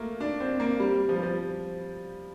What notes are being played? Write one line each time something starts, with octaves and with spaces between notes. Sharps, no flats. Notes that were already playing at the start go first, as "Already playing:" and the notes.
Already playing: A3 A#3
D4
C4
A#3
G3
F3
G3
F3